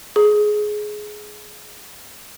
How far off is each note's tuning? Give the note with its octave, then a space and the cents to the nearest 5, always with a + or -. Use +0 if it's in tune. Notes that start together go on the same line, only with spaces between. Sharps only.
G#4 +15